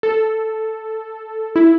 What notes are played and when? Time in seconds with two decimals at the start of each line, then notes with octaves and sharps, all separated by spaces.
0.03 A4
1.56 E4